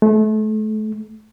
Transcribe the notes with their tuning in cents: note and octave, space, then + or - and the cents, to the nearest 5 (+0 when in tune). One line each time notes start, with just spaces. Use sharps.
A3 -35